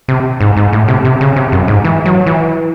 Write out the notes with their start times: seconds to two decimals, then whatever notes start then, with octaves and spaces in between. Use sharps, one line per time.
0.08 C3
0.41 G#2
0.57 G#2
0.73 A2
0.88 C3
1.05 C3
1.21 C#3
1.36 C3
1.52 F#2
1.68 G#2
1.85 E3
2.05 F#3
2.26 E3